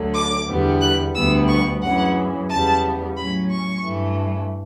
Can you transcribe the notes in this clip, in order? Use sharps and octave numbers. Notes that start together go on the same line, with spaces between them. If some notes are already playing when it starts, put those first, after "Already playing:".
Already playing: D2 D3 F#3
D6
E2 D3 G3 B3
F#6
D2 D3 G3 B3 E6
C#6
F#2 C#3 E3 F#5
E2 C#3 G3 B3 A5
A2 F#3 C#4 B5
C#6
G2 E3 A3